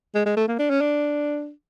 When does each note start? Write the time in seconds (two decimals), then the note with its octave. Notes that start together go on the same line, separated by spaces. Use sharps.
0.15 G#3
0.26 G#3
0.37 A3
0.48 A#3
0.59 D4
0.70 C#4
0.81 D4